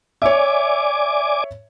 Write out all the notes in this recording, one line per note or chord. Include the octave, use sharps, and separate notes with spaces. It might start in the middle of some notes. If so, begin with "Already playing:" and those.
C#5 D5 E5 G#5 D6